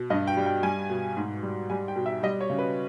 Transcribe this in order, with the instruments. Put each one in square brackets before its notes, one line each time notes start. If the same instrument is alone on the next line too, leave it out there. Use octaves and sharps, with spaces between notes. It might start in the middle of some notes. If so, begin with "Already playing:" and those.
Already playing: [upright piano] B2
G2 D#5
G5
G3
G5
G3 G#5
B2
G#2
G3
G3 G#5
G5
B2
E5
G3 D#5
C#5
C#3
B4